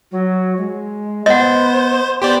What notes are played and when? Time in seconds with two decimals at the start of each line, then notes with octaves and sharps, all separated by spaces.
0.11 F#3
0.57 G#3
1.26 B3 C5 D#5 F#5
2.22 B3 G4 C5 D5